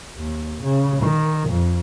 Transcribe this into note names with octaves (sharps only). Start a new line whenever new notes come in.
D#2
C#3
D#3
F2